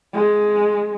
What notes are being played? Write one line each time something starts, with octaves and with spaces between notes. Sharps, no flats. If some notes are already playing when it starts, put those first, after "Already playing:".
G#3